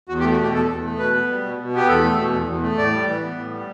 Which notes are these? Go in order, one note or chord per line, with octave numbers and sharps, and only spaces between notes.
E2 F#4
G4
A3
F#4
B2 G4
E2 A4
E2
A3
B2 B4
B3
G3
B2
B2
B3 G4
E2 A4
A3
B2
E2
E2
A3
A2 D5
G3
E3
B3
A2
G3